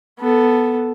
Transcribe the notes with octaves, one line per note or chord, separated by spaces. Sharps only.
B3 A4